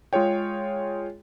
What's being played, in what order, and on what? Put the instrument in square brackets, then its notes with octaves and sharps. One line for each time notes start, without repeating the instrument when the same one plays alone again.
[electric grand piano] G#3 F4 G#4 C#5 G5